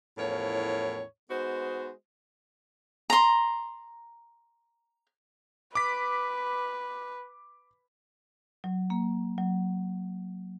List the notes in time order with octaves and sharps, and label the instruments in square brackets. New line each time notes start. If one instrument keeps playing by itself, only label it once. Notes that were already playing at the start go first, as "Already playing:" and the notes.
[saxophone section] E2 A2 F3 C#4 A#4 C#5
G#3 B3 D#4 F#4 C5
[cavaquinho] A#5 C6
[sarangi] B4 [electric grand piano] D6 B6
[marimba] F#3
A#3
F#3